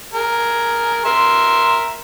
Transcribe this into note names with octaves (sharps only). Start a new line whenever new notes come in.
G#4 A#4
A#4 E5 C6